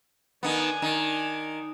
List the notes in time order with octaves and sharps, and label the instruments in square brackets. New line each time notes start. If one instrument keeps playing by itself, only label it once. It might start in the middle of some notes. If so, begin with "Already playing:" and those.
[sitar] D#3 B3 [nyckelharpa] D4 G#5
[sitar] D#3